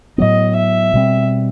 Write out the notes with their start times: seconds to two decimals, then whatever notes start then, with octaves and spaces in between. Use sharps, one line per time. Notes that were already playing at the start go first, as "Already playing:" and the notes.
0.18 A2 F#3 B3 D#5
0.56 E5
0.94 B2 G3 C4